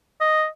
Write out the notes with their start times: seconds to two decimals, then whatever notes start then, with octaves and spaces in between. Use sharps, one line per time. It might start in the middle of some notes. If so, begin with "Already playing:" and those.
0.21 D#5